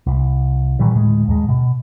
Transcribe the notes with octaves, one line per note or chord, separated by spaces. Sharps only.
C2
A#2 D#3 E3 G3
D2 A2 G#3
D#2 G#2 G#3
B2